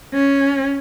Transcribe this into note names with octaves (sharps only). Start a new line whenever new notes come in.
C#4